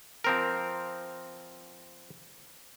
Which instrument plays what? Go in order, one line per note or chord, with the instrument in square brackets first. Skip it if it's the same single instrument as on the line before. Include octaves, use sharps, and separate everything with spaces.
[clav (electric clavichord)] F3 C4 A#4